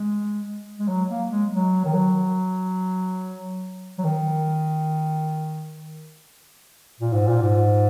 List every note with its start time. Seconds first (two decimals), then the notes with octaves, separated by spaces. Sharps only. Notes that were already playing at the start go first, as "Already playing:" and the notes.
Already playing: G#3
0.79 G#3
0.88 F#3
1.09 A#3
1.30 G#3
1.52 F#3
1.85 D#3
1.94 F#3
3.98 F#3
4.04 D#3
7.00 A#2
7.13 G#2
7.28 A#2
7.43 G#2